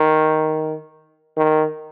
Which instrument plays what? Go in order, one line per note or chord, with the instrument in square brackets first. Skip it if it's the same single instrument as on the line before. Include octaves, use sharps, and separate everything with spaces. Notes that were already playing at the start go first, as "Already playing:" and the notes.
Already playing: [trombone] D#3
D#3